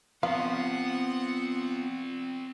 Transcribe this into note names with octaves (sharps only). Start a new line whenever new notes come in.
F3 B3 C4 F4 D5 F5 F#5